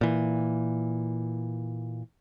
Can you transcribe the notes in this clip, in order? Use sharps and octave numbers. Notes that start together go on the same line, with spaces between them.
A#2 E3